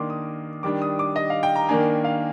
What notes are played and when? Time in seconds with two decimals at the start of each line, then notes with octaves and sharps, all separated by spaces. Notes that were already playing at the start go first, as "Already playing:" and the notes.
Already playing: D#3 A#3 D4 C6 D6
0.10 D#6
0.63 D#3 G3 D4 D6
0.82 D#6
0.99 D6
1.16 D#5
1.30 F5
1.43 G5
1.56 A#5
1.69 D#3 A#3 D4 G#5
2.04 F5